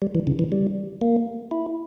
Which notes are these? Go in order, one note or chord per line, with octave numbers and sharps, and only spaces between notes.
G3
E3
C#3
E3
G3
A#3
E4